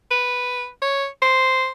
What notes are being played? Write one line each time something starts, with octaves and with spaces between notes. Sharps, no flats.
B4
C#5
C5